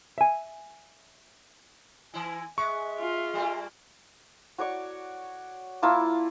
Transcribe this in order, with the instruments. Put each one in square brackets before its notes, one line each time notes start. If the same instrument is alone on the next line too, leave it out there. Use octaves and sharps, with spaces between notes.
[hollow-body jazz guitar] E5 G#5
[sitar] E3 E4 [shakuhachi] G#5
[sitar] G#3 [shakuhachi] E5 [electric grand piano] C#6
[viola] F4
[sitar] G3 A3 A#3
[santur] F#4 C#5 D5 C#6
A#3 E4 F4 A5